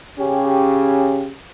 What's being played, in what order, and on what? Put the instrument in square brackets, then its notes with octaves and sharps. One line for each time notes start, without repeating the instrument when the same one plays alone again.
[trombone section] C#3 C#4 G4